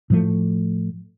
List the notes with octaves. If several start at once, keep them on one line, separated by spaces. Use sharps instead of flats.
A2 F3 A3